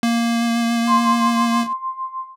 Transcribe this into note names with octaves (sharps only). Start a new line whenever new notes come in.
A#3
C6